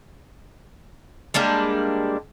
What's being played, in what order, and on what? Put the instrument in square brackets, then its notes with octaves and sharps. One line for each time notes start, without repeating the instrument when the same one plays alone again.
[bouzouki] G3 G#3 A#3 D4